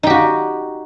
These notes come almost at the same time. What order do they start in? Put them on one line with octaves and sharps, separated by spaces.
D#4 G4 F#4